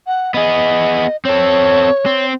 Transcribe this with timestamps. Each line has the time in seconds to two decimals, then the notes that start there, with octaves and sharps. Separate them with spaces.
0.07 F#5
0.34 B3 G#4 D#5
1.25 C4 A4 C#5
2.06 C4